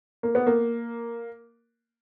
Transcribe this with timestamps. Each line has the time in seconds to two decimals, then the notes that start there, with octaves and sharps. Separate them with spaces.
0.23 A#3
0.35 B3
0.47 A#3